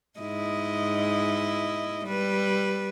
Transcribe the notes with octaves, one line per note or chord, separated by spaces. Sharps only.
G#2 E4 D#5
G3 B4